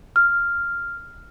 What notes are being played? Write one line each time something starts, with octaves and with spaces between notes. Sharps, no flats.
F6